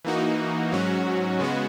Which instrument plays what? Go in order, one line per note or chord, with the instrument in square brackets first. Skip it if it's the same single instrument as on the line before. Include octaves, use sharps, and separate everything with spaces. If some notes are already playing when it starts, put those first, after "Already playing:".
[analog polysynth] E3 A#3 D#4 F#4
G#2 F#3 C#4 F#4
C#3 G#3 B3 F#4